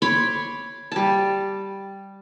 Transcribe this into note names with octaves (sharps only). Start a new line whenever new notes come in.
C#5 B5 C6 D6
G3 A5